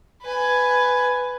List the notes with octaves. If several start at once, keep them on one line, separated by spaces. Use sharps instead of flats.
B4 G#5